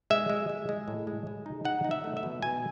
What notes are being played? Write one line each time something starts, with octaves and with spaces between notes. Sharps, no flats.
G#3 E5
G#3
G#3
G#3
A2
G#3
G#3
D#4
D#4 F#5
D#4
E5
A3
E5
B2
B2 G#5